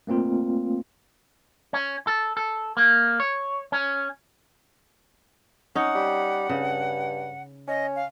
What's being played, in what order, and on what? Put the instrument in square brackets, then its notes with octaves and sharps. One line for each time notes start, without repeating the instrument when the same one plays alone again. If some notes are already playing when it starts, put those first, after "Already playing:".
[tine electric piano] A3 A#3 C4 F4
[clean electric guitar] C#4
A4
A4
A#3
C#5
C#4
[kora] C#4 D#4 [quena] F#5
[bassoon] G3
[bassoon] G2 [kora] C#3
[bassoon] C#4 [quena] D#5
[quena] F5